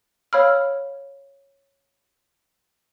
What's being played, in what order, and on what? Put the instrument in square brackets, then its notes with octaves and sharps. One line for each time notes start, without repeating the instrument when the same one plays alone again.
[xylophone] C#5 F5 B5 E6 F6